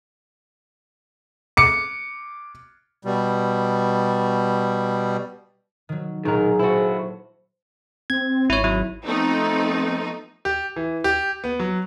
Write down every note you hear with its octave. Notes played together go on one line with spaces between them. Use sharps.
D6 C#7
B2 G3
D#3 F#3
B1 A#2 D#3 G#4 A#4 F#5
E4 F#4 A4 C5
C4 G#6
G#1 E4 C#5
F#3 E4
F3 A3 B3 C4 D#4
G4
E3
G4
B3
F#3